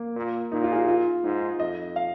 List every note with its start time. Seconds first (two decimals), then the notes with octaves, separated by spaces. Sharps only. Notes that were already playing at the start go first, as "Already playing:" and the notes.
Already playing: A#3
0.16 A#2
0.52 A#2 D#4
0.64 F4
0.72 G#4
0.76 F4
0.88 F4
1.24 G#2 D#4
1.60 F2 D#5
1.96 F5